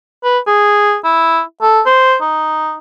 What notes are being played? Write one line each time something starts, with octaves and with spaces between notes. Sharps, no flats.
B4
G#4
E4
A4
C5
D#4